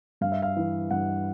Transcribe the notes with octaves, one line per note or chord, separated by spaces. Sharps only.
G2 F5
E5
F5
E3
G2 F#5